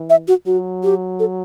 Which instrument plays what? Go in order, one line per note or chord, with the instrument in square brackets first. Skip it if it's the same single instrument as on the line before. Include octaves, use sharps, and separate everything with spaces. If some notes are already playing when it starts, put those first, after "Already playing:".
Already playing: [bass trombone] E3
[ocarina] E5
F#4
[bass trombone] F#3 [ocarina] F#4
[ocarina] G4
A4